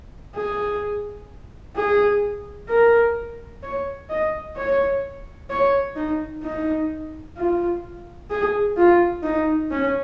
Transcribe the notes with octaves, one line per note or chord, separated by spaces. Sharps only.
G#4
G#4
A#4
C#5
D#5
C#5
C#5
D#4
D#4
F4
G#4
F4
D#4
C#4